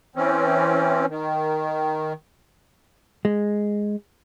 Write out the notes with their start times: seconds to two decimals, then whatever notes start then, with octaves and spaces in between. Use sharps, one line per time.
0.16 E3 C4 C#4
1.09 D#3
3.25 G#3